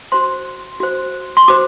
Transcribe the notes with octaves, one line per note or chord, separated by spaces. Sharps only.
F#4 C5 C6
F#4 C5
C6
F#4 C5 D6